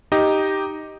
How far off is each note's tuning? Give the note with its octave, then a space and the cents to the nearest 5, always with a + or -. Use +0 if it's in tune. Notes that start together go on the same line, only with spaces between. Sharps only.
D#4 +0 G4 +0 D#5 +0